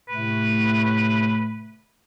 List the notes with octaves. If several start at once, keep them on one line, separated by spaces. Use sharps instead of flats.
A2 C3 A3 B4